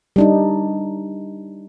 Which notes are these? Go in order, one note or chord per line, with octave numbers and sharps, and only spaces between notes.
G3 D4 D#4